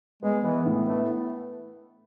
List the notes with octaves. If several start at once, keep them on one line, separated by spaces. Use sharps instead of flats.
G#3 B3
E3 B3
A2
A3 B3